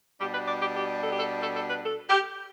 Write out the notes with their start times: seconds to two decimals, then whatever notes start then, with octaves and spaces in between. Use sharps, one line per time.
0.20 B2 G3 D4 G4
0.34 B4
0.47 D5
0.61 G4
0.74 G4
1.01 A4
1.10 G4
1.19 A4
1.43 A4
1.56 A4
1.70 B4
1.83 A4
2.10 G4